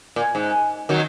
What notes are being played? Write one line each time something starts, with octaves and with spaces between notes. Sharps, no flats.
A#2
G#2
D#3 F#3